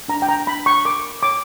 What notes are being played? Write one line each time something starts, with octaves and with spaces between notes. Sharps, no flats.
D4 A#5
G5
A#5
D4 B5
C#6
A#4 D6
C#5 D6